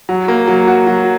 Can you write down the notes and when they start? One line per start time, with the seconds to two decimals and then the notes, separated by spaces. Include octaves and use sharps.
0.09 F#3
0.28 A#3
0.48 F#3
0.68 F#4
0.87 F#3